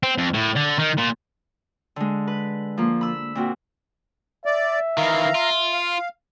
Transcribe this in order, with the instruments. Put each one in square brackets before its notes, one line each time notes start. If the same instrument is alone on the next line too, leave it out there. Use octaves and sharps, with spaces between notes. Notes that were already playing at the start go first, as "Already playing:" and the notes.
[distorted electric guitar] C4
F2
A2
D3
D#3
A#2
[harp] D3 G#3
B4
F3 A#3
B5 E6
A#2 C4 F#4
[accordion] D5 [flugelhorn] E5
[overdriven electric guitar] D#3 E3 [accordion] F5 A#5
[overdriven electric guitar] F4
[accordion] F5